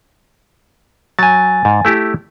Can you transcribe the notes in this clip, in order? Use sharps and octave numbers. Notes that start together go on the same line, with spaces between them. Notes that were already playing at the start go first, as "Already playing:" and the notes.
F#3 G#5 A6
G#2
A3 E4 G4